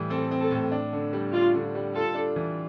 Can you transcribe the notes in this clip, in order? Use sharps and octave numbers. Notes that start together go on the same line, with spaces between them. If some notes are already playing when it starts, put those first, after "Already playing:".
Already playing: A2 E3 G3
C4 A4
C4
A4
A2
D4
D3
G3
D4 F4
D3
G3
F4 A4
D4
E3